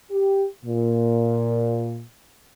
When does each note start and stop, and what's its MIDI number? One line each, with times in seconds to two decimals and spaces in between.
0.11 0.46 67
0.65 2.03 46